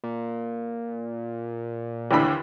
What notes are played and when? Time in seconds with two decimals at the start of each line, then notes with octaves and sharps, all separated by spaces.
0.04 A#2
2.11 D#2 D3 E3 B5